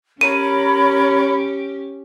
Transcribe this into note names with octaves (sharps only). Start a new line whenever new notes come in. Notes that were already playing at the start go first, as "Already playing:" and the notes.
C#4 G4 A#4 C#5 B5 D#7